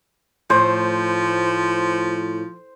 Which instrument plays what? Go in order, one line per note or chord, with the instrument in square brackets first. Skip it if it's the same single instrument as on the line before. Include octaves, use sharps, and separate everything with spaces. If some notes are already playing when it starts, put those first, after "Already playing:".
[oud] A2 [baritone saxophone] F3 [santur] C5